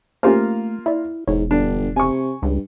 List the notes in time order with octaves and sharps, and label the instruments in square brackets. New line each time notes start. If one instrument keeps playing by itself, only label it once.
[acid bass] A3 [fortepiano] A#3 F4 [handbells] C#4 G4 C5
[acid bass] E4 [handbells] D5 E5
[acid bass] E1 [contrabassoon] G#2 [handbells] C#5
[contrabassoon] G1 [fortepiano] D4
[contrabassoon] C3 [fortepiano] G#5 C#6
[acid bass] C#2 [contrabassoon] G2